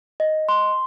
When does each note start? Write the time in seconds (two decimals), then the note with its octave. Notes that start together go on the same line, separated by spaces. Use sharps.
0.20 D#5
0.49 C6